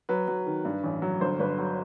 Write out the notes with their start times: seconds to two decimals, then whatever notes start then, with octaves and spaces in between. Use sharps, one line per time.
0.09 F#3 B4
0.28 F#3
0.46 D#3
0.65 G2
0.84 A1
1.02 F#3
1.21 G1 C5
1.39 G1 B4
1.58 F#3